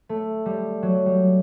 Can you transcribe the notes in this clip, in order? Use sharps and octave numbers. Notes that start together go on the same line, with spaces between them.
A3
G3
F#3
G3